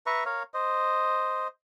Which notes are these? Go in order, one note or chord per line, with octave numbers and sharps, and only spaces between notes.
B4 E5 A#5 C#6
A#4 C#5 F5
C5 D#5